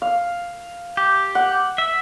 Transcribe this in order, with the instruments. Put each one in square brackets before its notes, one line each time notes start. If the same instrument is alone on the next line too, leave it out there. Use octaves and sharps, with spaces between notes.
[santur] F5
[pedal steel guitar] G4
[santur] F#5
[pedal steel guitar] E5